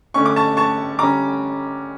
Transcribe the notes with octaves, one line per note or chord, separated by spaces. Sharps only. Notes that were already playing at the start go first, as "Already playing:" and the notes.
D3 A3 C#4 C#6
D6
A5 C#6
A5 C#6
D3 G3 C#4 A#5 D6